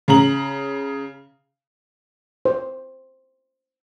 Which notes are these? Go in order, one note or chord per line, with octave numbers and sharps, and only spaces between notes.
C#3 A#5 F#7
C5